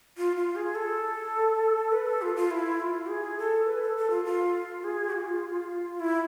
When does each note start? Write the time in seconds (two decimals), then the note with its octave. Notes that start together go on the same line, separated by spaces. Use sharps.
0.17 F4
0.36 F4
0.56 G#4
0.75 A4
1.92 B4
2.06 A4
2.22 F4
2.36 F4
2.51 E4
2.80 F4
3.09 G#4
3.39 A4
3.67 B4
3.82 A4
3.97 A4
4.10 F4
4.25 F4
4.84 G#4
5.13 F4
6.00 E4